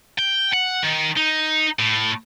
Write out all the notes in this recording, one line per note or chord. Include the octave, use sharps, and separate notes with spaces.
G5
F#5
D#3
D#4
A2